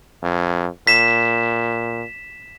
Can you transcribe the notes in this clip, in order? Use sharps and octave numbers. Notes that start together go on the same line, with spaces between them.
F2
A#2 B6 E7